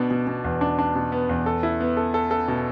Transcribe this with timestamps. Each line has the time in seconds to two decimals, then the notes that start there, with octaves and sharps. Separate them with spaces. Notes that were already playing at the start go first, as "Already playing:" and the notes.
Already playing: B2 B3 D4
0.11 B2
0.27 B2
0.44 E2
0.61 D4
0.79 D4
0.95 B2
1.12 B3
1.29 E2
1.46 A4
1.63 E4
1.80 B3
1.97 A4
2.14 A4
2.31 A4
2.48 B2